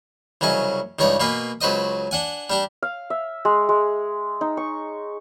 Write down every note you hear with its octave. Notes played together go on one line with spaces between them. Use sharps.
C2 C#3 F#3 C#4 D#5
C#2 G2 D#4 C#5 D5
B2 A#3 B4 G#5
C#2 F#3 B4 C5 D#5 D#6
D4 F#5 G#5
G3 D4 G4
F5
E5
G#3
G#3
D#4
C#6